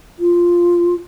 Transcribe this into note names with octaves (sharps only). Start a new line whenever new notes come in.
F4